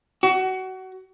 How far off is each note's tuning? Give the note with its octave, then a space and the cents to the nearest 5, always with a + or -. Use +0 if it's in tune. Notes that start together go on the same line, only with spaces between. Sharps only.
F#4 +25